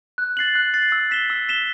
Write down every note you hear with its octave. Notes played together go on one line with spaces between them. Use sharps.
F#6
A6 C7 F#7
F#6
A6 C7 F#7
E6
B6 E7 G7
E6
B6 E7 G7